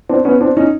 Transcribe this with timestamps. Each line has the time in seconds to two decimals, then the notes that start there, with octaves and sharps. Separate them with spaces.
0.09 C4 D4
0.25 B3 C#4
0.41 C4 D4
0.57 C#4 D#4